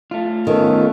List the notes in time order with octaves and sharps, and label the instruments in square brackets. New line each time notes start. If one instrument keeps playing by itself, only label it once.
[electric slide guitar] A3 F4
[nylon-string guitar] D#3 [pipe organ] B3 C#4 [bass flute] A4